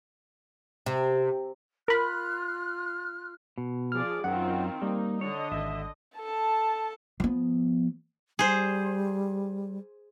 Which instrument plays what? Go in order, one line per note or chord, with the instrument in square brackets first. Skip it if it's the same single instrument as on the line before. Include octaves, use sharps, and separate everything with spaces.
[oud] C3
[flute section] F4 F6 F#6 [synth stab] A#4 B5
[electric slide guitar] B2
[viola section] F3 G#4 D5 [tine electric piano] F6
[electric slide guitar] F#2 [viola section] D#3 C4 F4 [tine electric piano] F#5
[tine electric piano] G3 [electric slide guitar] A#3 [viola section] D#4
[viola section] D3 D#5 [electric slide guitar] C#5
[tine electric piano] G#1 [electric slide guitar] E5
[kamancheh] A4 A5
[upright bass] F3 B3
[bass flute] G3 [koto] G#4 C5